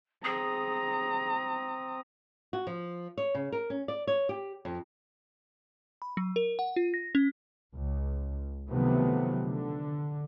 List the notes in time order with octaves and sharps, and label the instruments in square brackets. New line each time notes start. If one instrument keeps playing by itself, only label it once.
[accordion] C4 D#6 [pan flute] G#4 [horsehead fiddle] A#5
[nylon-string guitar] F#4
F3
C#5
C#3
A#4
C#4
D5
C#5
G4
F2
[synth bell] B5
F#3
A#4
F#5
F4
A#6
C#4
[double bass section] C#2
C3 D#3 F3 F#3 A3 B3
D3